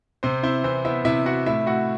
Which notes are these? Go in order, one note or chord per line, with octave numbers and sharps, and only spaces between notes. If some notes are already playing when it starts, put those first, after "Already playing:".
C3 C4 C5
C4 E4 C5
E3 C4 C5
B3 E4 E5
C3 E4 E5
E4 F#4 F#5
A2 E4 E5
A2 F#4 F#5